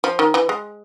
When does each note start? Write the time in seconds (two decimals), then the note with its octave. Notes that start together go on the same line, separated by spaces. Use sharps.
0.04 F3
0.19 D#3
0.34 E3
0.49 G#3